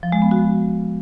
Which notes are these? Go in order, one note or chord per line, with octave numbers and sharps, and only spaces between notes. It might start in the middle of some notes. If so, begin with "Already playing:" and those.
F3
G#3
B3
F#4